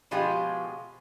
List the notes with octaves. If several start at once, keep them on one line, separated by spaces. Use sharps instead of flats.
B2 F3 G#3 F4 G4